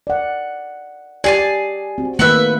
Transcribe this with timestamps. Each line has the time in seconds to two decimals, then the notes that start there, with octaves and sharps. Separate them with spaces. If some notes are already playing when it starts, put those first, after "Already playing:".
0.07 D5 F#5
1.24 G4 G#4 D5 G#5 A5
1.98 C4 F#4
2.19 D#3 A3 A#3 B4 E5 F#5